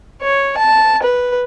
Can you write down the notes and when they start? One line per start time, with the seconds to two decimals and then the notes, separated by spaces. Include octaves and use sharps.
0.22 C#5
0.58 A5
1.03 B4